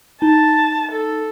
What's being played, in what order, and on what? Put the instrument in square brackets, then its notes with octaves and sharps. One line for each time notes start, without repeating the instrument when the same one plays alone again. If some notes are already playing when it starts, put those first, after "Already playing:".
[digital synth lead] D#4 [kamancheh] A5
[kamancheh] A4